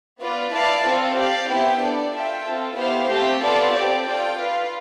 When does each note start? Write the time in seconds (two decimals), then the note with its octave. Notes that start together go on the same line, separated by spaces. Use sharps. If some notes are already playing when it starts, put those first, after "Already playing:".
0.20 B3 F4 B4 D5
0.52 E4 B4 D5 F5 A5
0.84 C4 F4 A4
1.16 G4 D5 F5
1.49 B3 E4 G4 C5 G5
1.81 D4 A4 D5
2.13 F4 A4 E5 G5
2.45 C4 F4 A4
2.77 B3 E4 G4 C5 F5
3.09 A3 C4 G4
3.41 B3 F4 A4 D5
3.73 C4 G4 D5
4.05 F4 A4 D5 G5
4.38 F4 B4 F5